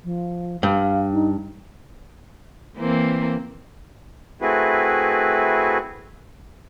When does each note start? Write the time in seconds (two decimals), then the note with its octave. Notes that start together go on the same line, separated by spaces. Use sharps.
0.04 F3
0.63 G2 F5
1.13 D#4
2.78 E3 A#3 C4
4.41 A3 C4 E4 F#4 G#4 B4